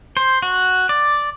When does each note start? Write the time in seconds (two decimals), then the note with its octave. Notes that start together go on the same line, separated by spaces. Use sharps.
0.17 C5
0.42 F#4
0.89 D5